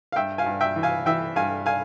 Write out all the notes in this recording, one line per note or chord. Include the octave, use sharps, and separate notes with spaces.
F5
G2 E5 G5
F5 G#5
G2
E5 G5
E3
F5 G#5
E3 E5 G5
G2 F5 G#5
F5 G#5